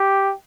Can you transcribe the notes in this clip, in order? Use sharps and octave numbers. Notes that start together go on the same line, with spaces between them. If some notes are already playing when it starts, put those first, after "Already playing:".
Already playing: G4